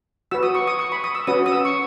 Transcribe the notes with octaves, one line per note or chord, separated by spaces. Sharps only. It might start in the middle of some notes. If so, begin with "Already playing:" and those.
F#4 B4 E6
D#6
C#6
D#6
C#6
B5
D#6
E6
C#4 F#4 B4 D#6
D#6
E6
C#6